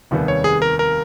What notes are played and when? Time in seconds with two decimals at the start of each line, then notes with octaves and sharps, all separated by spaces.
0.11 F1 D#2 D#3 G3 B3
0.28 C#5
0.44 G#4
0.62 A#4
0.79 A#4